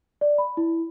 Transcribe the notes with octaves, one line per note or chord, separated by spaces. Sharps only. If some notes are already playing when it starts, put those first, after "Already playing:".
D5
B5
E4